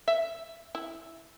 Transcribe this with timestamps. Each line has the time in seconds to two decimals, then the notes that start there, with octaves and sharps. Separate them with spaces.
0.08 E5
0.75 E4